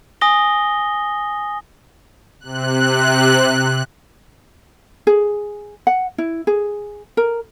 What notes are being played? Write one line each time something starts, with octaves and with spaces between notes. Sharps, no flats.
G#5 D#6 A#6 G7
C3 F#6
G#4
F#5
E4
G#4
A#4